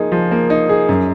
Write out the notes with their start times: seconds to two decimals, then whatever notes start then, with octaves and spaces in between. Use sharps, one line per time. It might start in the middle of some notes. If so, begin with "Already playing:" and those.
Already playing: F3 A#3 D#4 G#4
0.12 F3
0.31 A#3
0.50 D#4
0.69 G#4
0.89 F#2